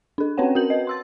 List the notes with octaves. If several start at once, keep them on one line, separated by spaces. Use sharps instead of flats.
D4 A4
C4 C#4 B4 C#5 F#5 G5
F#4 A#4 G6 F#7
B4 D#5
C6 E6 A6